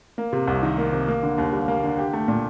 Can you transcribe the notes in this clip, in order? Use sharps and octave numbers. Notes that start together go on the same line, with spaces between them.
A#3
C3
C2
D#3
A#3
C3
A#3
D3
D#2
G3
A#3
D3
G4
A3
A#2